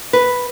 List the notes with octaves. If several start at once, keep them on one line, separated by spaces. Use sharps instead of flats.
B4